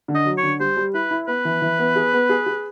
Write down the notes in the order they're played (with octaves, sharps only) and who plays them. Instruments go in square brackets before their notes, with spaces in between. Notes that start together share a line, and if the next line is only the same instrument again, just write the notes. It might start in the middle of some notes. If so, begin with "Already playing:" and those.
[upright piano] D3
[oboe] D#5
[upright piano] F#3
[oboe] C#5
[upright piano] D3
[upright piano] G3 [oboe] C5
[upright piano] G3
[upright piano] E4 [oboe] B4
[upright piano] E4
[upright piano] B3 [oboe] B4
[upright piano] E3
E3
B3
G#4
B3
G#4
G#4